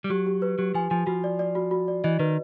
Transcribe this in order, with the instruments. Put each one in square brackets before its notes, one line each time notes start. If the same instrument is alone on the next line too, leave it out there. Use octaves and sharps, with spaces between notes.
[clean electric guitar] G3
[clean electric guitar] F#3 [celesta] G4
[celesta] G4
B4
[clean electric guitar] F#3 [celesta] G4
[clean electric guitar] F3 [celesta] G#5
[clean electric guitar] F3 [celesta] G#5
[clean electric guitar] F3 [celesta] F#4
[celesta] D5
D5
F#4
F#4
D5
[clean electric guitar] E3 [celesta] D#5
[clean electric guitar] D#3 [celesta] B4